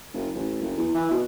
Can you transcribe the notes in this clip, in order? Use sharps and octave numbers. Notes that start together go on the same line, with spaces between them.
F#1
A1
F#1
E2
E3
B2